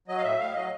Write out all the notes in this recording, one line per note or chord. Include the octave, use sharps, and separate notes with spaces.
F#3 D#5
F5
A2 E5
A2 F5
F#3 D#5